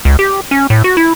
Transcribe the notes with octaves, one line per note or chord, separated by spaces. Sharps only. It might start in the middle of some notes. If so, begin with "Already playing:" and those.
C#2
G4
C#4
A2
F#4
E4